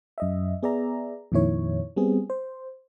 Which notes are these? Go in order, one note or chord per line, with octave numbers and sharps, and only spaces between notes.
F#2 D#5 E5
B3 G#4 D5 E5 A#5
F2 A#2 D#3 E4 C#5
G3 B3 C4 G#4
C5